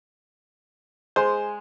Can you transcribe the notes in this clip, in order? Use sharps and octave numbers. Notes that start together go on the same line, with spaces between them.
G#3 C5